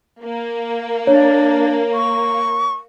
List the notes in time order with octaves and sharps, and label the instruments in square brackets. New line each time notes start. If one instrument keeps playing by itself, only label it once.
[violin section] A#3
[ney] D4 [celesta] C#5
[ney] C#6